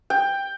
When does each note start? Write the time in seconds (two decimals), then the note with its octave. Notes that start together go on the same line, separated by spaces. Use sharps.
0.10 G5